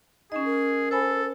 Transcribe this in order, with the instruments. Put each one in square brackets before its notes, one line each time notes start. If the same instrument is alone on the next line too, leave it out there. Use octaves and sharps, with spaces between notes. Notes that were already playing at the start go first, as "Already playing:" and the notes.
[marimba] C#4 D#5 [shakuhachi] D#4 [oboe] G#4
[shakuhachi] A#4
[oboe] A4 [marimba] C5 G#5 B5